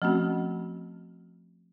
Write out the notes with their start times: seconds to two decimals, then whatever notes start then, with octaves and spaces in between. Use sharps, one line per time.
0.02 F3 A3 C4 C#4 F#4